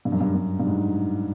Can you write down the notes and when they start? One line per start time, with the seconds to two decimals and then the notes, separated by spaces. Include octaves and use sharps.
0.05 G2
0.12 F#2
0.21 G2
0.35 G2
0.60 G2
0.67 G#2